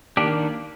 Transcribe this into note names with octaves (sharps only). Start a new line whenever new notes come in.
D#3 A#3 D4 G4